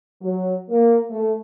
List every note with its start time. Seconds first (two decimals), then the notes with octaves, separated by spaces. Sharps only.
0.21 F#3
0.69 A#3
1.10 A3